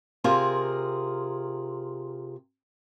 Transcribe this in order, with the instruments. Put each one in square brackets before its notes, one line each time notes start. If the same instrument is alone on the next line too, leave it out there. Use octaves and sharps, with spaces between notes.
[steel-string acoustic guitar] C3 F4 G#4 A#4